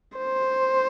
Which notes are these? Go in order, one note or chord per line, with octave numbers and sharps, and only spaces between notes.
C5